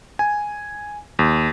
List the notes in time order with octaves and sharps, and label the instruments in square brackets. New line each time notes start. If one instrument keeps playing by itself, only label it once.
[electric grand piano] G#5
D#2